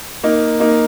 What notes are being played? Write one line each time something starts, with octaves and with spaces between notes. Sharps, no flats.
A#3 D#4
A#3 D#4